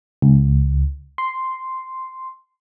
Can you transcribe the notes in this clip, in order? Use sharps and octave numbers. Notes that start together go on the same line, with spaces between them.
C#2
C6